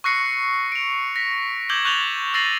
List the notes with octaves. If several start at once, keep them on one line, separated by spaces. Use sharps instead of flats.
C#6 E6 F#6 A#6 C7 C#7
D7 F7
A#6 B6
D6 E6 G6 G#6 F#7 G7
C#6 F#6 G6 A6 F7 G7
E6 A6 A#6 C7 D#7 F#7